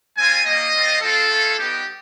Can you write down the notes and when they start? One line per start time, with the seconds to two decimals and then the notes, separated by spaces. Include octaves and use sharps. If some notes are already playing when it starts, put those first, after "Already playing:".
0.17 G3 C4 F4 G#5
0.45 G3 A#3 D#4 D#5
0.74 G3 C4 F4
1.02 C4 F4 A4
1.29 A3 C#4 F4
1.58 G3 B3 D#4 G4